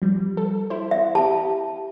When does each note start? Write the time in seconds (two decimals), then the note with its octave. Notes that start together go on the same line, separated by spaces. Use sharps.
0.02 F3 G3
0.37 A4
0.70 E4 C5
0.91 E5
1.15 G4 A5